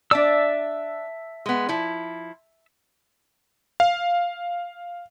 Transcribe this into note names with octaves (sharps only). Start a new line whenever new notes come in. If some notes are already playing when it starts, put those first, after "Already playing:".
D4 D5 E5 A5 E6
G#3 B3
F3 E4
F5